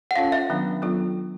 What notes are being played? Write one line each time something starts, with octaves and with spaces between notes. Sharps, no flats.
F#5
C#4 F4 A4 C#5 F5
E5
D#3 F#3 B3 D4
F#3 B3 D4 F4 A4